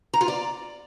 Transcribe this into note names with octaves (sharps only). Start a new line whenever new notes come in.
A#5
F4
D5